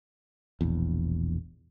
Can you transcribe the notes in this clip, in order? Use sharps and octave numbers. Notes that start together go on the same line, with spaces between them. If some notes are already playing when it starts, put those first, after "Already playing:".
E1 A#1 E2